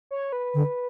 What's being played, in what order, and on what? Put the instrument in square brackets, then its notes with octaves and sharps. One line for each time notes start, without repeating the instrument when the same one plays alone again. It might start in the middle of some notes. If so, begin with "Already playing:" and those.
[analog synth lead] C#5
B4
[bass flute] D3